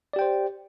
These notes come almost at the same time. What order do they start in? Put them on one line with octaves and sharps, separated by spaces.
D5 G4 G5 C5